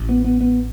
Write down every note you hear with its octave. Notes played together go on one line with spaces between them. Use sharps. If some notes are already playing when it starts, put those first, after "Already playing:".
Already playing: A1 A2
B3
B3
B3